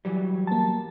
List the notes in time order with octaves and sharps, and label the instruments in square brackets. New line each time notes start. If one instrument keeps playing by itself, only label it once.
[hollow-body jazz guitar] E3 F#3 G3
[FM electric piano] A#3 A5